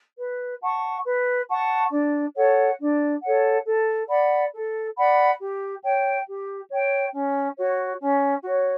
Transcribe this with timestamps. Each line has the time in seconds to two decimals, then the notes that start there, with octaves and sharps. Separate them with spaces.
0.19 B4
0.62 F#5 A5 C#6
1.05 B4
1.49 F#5 A5 C#6
1.91 D4
2.35 A4 C#5 F#5
2.79 D4
3.22 A4 C#5 F#5
3.66 A4
4.09 D5 F#5 B5
4.53 A4
4.96 D5 F#5 B5
5.40 G4
5.83 C#5 G5
6.26 G4
6.70 C#5 G5
7.14 C#4
7.57 F#4 C#5
8.00 C#4
8.43 F#4 C#5